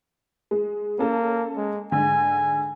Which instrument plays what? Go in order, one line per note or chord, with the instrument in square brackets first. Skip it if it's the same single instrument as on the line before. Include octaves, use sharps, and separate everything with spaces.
[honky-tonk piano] G#3
[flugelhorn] A#3 [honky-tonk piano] C#4 A4
[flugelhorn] G#3
[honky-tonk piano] G#2 D3 [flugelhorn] G#5